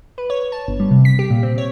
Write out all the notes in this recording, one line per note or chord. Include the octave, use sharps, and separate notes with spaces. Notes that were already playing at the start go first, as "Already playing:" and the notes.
B4
C#5
A5
G1
G3
C3
B6
G4
A#2
C4
C#5